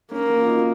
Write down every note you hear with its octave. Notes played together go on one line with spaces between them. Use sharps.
A#3 C#4
F#4
F4
D#4